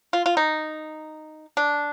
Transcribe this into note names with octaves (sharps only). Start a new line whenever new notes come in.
F4
F4
D#4
D4